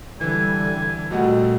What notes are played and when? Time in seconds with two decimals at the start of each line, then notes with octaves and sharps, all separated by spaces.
0.21 D3 E3 G3 G#5
1.11 C2 A#2 G3 A3 F#4 D#5 F#5